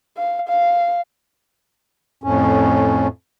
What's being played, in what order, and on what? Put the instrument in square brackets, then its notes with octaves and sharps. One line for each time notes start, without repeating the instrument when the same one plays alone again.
[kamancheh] F5
F5
[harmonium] F2 A2 C#4